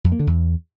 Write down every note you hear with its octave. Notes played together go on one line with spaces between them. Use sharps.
F2
A#3
D3
E2